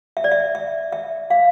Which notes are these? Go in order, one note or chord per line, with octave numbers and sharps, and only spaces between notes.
E5
D5
E5
E5
E5
F5